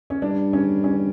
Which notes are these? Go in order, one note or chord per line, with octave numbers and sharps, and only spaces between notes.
C#4
G2 D4
C#4
C#4